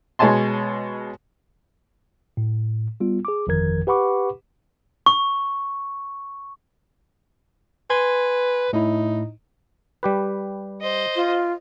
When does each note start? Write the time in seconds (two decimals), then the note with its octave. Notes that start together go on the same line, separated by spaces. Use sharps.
0.19 B2 G#3 C#5 G#5 A5 C6
2.37 A2
3.00 G3 B3 F4
3.25 G#4 D6
3.47 G1 F2 D#3 F3 A#4 G#6
3.87 G4 B4 F#5 B5 C#6 D6
5.06 C#6
7.90 B4 G#5 C6 G#6
8.73 A2 D#4 E4
10.03 G3 G4 B4
10.80 C5 D#5
11.16 F4